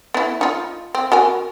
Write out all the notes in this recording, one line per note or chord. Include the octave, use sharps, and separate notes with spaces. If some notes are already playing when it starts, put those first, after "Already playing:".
B3 E4
D#4 F4
C4
F#4 A#4 G#5